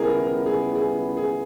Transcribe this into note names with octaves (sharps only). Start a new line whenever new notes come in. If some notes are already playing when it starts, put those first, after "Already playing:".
Already playing: C#2 C#3 G3 B3 E4 G#4 A#4
G#4
G#4
G#4